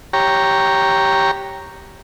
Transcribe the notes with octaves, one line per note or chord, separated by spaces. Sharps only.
G4 C#5 A#5